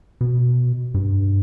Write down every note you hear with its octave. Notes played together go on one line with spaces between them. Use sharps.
B2
G2